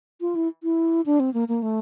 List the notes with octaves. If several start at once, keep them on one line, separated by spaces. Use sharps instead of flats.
F4
E4
E4
D4
C4
A#3
A#3
A3